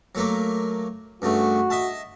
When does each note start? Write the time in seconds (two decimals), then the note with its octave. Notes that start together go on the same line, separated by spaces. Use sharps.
0.15 F#3 A3 A#3
1.22 G2 C#3 A3 F#4
1.70 D#5 E5 A5